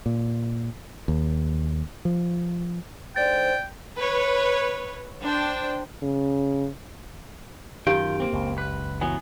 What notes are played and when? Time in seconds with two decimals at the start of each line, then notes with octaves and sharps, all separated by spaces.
0.06 A#2
1.08 D#2
2.05 F3
3.16 G#2 D3 C5 D5 G5 A6
3.96 B4 C#5
5.23 D4 C5 G5
6.03 C#3
7.87 F#2 D#3 F4 G4 F5 G5
8.20 A#3 C4
8.33 F#1 C#2
8.58 B4
9.01 E3 F#3 B3 G#5